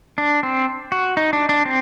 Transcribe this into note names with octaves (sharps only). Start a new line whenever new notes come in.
D4
C4
F#4
D#4
D4
D4
C4